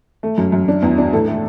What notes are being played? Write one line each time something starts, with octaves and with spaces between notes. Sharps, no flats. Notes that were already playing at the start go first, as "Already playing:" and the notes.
A3
F#2
F#2
D4
E2
D4
A2 A4
A3